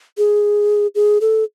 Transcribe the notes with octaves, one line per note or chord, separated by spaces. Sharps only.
G#4
G#4
A4